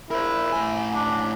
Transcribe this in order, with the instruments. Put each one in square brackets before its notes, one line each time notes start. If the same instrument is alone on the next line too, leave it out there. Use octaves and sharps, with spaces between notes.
[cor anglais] E4 [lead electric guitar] A#4 C5
[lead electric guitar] A2 G#5
[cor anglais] D4